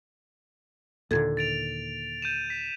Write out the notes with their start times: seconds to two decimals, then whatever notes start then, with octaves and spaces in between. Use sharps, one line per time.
1.11 D#2 A#2 D3 A4 G#6
1.37 A6 D7 F7
2.22 G6 D#7 E7
2.50 B6